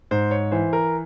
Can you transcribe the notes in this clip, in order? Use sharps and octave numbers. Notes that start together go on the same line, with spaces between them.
G#2 C5
C#5
E3 C5
A#4